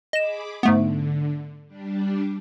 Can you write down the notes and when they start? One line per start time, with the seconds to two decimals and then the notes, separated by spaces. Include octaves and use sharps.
0.13 G#4 D#5 B5 D6 E7
0.63 G#2 D3 A3 B3
1.67 G3 D4